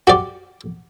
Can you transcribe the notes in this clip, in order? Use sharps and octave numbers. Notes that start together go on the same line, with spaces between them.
F#4 G4 D5